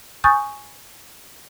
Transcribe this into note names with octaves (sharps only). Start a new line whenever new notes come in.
G#5 C#6 D#6 F#6 G6 A6